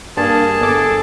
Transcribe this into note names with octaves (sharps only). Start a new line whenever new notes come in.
G2 A#3 G#4 A5
G1 A4 D6 E7